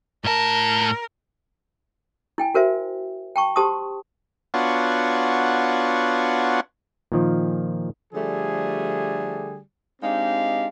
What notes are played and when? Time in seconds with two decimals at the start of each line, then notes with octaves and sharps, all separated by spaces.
0.25 A2 A#4 A5
2.38 E4 G5 G#5
2.54 F#4 A#4 C5 E5
3.36 G5 A5 C#6
3.56 G4 C5 A5 C6 C#6 D#6
4.54 B3 D4 F4 F#4 C#5
7.12 A#2 D#3 F3
8.13 D3 F3 G3 A3 G#4
10.02 G#3 C4 D4 D#4 G4 F5